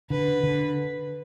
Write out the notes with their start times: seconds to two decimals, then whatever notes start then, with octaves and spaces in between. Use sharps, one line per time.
0.10 D3 B4
0.43 D3